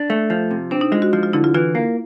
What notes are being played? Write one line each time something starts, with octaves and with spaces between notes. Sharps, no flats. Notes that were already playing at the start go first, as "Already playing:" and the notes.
Already playing: D4
A3
F3
C3
C4 D4
D#4
G#3 F4
F#4
F3 F4
F4
D3 E4
F4
E3 F4
A#3